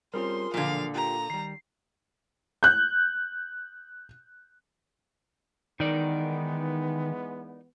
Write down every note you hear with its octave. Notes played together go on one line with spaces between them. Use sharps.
G3 C4 C#4 F4 G#4 A#4 C6
B1 A#2 D3 F3 F5
F4 G4 A#4 A#5
D#3 G3 C7
F#6 G6
D#3 E3 G#3 B3 D#4 A#4 D5